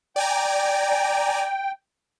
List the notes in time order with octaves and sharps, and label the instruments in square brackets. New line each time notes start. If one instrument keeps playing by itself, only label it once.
[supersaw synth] D5 G#5 A#5 [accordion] G5